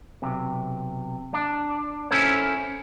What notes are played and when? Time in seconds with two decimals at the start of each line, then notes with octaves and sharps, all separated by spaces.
0.22 B1 C3
1.34 D4
2.11 C#4 E4 A4 A#4 C5 C#5